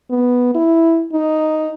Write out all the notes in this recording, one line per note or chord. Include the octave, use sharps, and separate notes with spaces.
B3
E4
D#4